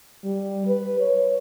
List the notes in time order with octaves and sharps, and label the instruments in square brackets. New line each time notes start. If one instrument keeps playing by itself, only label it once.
[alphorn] G3
B4
C#5